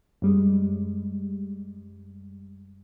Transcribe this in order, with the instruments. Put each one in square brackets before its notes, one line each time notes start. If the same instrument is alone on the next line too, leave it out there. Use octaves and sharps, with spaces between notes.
[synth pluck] F#2 G3 G#3